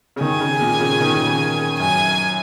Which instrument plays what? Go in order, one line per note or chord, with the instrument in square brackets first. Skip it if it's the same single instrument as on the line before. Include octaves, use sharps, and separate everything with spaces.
[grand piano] C#3
[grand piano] D#3 [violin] G#5
[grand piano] C#3
A#2
C#3
D#3
C#3
[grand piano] F#2 [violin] G#5